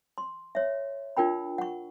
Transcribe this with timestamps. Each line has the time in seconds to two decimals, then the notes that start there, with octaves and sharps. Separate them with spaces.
0.18 C6
0.55 C#5 E5
1.17 D4 F4 A#4 G5 B5
1.58 F#5 C#6